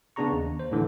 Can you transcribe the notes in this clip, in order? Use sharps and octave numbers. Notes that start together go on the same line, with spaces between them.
C#3 B3 D4 G#4 A#5 C#6
D#2
C5
A2 D3 E3